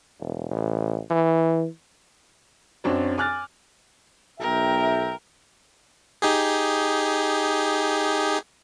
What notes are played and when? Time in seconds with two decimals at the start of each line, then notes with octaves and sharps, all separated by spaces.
0.20 E1
0.51 A1
1.11 E3
2.84 F#2 C4 D4 F#4 C#5 D5
3.18 G#5 D6 F6 F#6 A6
4.40 B1 A#4 E5 G5
6.22 D#4 G4 G#4